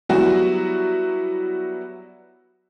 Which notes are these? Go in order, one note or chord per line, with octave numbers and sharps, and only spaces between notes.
F#3 G3 B3 E4 F#4